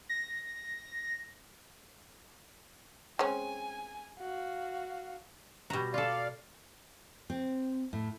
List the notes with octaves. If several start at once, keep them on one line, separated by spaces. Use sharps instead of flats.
A#6
G#3 C4 C#4 G#5
F#4 F5
B2 G3 F#4 A#5
F4 A4 D5 F5
C4
A2